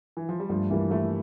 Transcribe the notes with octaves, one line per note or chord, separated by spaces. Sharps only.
E3
F3
G3
G2 F3 A3
E3 G3 A#3
F3 A3 E4